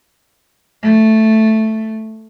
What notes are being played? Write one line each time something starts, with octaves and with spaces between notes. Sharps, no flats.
A3